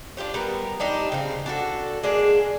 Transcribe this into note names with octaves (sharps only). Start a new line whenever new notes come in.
D4 F4 G4 C#5
G3 B3 A#4
G3 D4 D#4 G4
C#3 G3 C4
D4 F#4 A4
G#3 A#3 D4 G#4